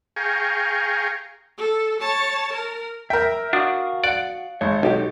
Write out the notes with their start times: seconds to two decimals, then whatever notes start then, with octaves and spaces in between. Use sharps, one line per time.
0.16 G#4 F5 G5 G#5 A#5 C#6
1.58 A4
2.01 C#5 A5
2.53 A#4
3.10 A#4 E5 G5
3.53 D4 F#4 F5 D#6
4.04 D5 F#5
4.61 G#1 C#5
4.83 B1 D#4 F#4 G4